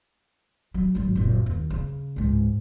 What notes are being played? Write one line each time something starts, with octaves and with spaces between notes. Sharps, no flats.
F#3
G#1 F#3
F#1 A#2
D#2
C#3
C#2 G#2